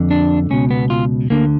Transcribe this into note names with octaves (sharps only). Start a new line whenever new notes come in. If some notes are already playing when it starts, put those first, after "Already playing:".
Already playing: F2 D3
D4
C#2 B2 C#4
B3
F4
D2 D3 A#3